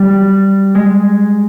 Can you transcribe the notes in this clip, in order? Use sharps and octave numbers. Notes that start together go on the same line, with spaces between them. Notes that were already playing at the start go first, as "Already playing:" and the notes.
Already playing: G3
G#3